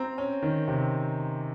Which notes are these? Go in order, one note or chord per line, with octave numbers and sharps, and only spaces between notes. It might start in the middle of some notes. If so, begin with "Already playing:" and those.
Already playing: C4 A#5
C#4
D#3
C3